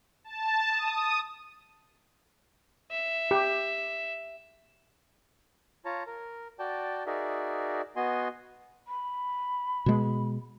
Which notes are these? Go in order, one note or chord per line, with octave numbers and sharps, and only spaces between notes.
A5
D#6
E5
G4
F4 C#5 A5 A#5
A#4
F#4 D5 G5 A5
D#4 F#4 G#4 A#4 D5 E5
B3 F#4 D#5 G#5 C6
B5
B2 G#3